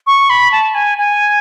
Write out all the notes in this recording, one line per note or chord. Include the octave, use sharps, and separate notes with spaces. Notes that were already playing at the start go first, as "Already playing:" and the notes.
C#6
B5
A5
G#5
G#5